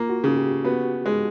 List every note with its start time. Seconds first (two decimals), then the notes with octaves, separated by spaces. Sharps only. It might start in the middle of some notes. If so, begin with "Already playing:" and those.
Already playing: A#3 F4
0.10 F#4
0.24 C#3
0.37 G4
0.64 B3 F#4
1.06 G#3